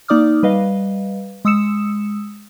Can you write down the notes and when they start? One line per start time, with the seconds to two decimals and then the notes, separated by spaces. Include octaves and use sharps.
0.08 A#3 D#4 D5 D6 D#6 F6
0.43 G3 B4 D#5 F5
1.45 G#3 D#6 E6 C#7 E7